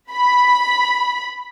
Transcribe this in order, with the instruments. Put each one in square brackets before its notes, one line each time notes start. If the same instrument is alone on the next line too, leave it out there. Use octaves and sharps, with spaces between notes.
[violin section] B5